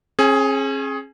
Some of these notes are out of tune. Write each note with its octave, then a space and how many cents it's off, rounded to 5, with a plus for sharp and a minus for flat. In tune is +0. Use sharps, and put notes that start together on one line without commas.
C#4 -40 G#4 +15